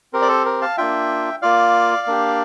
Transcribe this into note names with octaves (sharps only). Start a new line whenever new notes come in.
C4 G4 A#4
D5
A4 C5
A#4
F5 A5
A#3 D4 F4 E5 G5
A#3 F4 D5 F5
A#3 D4 G4